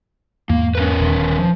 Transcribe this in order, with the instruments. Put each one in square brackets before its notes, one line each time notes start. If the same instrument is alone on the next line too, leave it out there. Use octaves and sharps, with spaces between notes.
[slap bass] E2 G#2 [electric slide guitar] A#3
[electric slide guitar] C#4 A#4 B4
[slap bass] D#1 D3
[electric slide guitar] F3